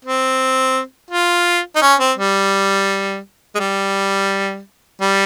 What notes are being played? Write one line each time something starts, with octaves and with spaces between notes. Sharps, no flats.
C4
F4
D#4
C#4
C4
G3
G#3
G3
G3